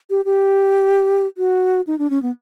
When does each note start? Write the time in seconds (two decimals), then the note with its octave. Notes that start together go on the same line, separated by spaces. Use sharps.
0.10 G4
0.25 G4
1.38 F#4
1.87 D#4
1.99 D4
2.10 C#4
2.22 B3